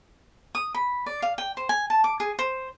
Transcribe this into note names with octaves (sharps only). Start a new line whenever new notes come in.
D#6
B5
D5
F5
G5
C5
G#5
A5
D6
G#4
C5